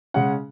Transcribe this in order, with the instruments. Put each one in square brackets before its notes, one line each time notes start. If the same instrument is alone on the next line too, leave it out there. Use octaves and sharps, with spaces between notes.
[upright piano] C#3 G#3 C#4 F#5